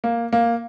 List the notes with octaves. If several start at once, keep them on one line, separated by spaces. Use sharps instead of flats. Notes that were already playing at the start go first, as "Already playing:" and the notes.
A#3
A#3